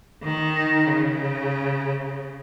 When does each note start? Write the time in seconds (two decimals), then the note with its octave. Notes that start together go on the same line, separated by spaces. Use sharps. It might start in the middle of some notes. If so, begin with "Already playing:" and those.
0.23 D#3
0.87 C#3